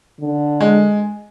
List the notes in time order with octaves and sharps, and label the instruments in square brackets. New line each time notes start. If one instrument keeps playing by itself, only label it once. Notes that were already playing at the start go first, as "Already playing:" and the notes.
[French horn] D3
[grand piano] G#3